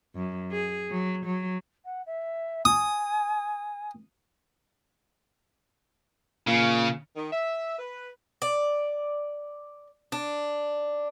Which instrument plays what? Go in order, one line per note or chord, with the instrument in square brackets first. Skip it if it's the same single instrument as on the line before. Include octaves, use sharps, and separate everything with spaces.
[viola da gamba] F#2
G#4
F#3
F#3
[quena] F#5
E5
[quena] G#5 [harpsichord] D#6
[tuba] A#2 [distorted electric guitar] C#3
[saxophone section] D#3
E5
B4
[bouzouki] D5
D4